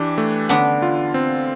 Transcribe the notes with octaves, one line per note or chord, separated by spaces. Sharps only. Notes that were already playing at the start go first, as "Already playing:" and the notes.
Already playing: E3 D4 G4
A3
D3 B3 D4
F4
C4